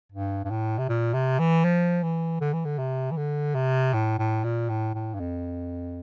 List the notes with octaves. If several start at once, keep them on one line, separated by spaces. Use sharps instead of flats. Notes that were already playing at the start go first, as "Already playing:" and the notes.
G2
G2
A2
C3
A#2
C3
E3
F3
E3
D3
E3
D3
C3
E3
D3
C3
A2
A2
A#2
A2
A2
G2
F2